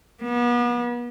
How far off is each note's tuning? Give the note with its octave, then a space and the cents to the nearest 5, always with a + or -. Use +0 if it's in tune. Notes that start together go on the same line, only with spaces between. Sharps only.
B3 -35